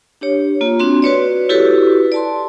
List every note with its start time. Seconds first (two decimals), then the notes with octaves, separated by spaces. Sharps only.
0.21 D4 G4 C#5
0.61 A#3 F4
0.79 C4 D4 F#4 C6
1.02 F#4 B4 C#5 D5
1.49 E4 F#4 G4 A4 B4
2.12 D5 A5 C6